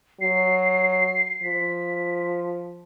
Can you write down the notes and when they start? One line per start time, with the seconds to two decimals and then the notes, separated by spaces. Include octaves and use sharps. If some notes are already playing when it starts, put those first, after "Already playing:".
0.21 F#3 C7
1.43 F3 B6